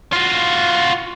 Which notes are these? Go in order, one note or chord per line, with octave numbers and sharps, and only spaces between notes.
F4 F#4